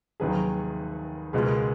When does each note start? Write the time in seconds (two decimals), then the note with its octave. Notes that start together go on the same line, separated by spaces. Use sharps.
0.20 F1 D#2 D#3 F#3 G#4 B4
1.33 C#2 B2 G#3 B3 F4 G#4
1.46 A#4